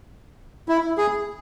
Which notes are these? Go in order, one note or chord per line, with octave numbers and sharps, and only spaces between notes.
E4
G#4